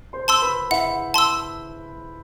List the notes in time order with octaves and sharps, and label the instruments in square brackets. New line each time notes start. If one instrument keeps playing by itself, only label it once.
[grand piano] C5 C6
[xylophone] A5 C6 E6
[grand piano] B4 B5
[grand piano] E4 E5 [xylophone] F#5
[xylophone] A5 C6 E6